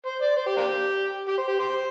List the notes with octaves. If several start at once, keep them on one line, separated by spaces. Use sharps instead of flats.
C5
D5
C5
G4
A#3 D4 G4
G4
C5
G4
G4 C5